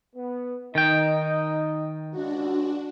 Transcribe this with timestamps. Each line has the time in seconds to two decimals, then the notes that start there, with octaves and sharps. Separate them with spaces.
0.16 B3
0.75 D#3 D#4 D#5 G5
2.11 C#2 D4 F#4